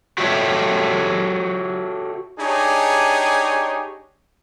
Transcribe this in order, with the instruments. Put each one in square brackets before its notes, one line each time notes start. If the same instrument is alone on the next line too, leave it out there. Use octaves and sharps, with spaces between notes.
[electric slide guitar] F#4 G4 A4 C#5 E5
[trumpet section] D4 D#4 G4 G#4 C#5